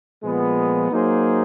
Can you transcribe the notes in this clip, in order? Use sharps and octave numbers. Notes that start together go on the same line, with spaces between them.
A#2 F3 G#3 B3
F#3 A#3 D#4 G#4 C5